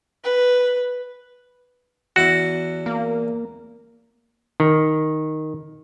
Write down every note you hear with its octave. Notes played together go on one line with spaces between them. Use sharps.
B4
E2 E4 F#4
A#3
D#3